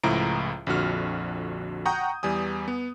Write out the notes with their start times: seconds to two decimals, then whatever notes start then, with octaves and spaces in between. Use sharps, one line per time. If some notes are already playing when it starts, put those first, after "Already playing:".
0.03 C#2 A2 F3 E4 A#5 D7
0.67 A#1 F2 D3 F#4 F6
1.86 F#5 G5 A#5 C#6 D#6 G6
2.23 E2 E3 G3 G#5 D#6
2.68 B3